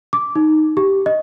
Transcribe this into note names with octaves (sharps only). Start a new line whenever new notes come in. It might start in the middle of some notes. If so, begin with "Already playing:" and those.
D6
D#4
G4
D#5